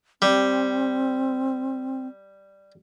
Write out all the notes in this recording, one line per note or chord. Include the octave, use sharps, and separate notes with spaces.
G3 C4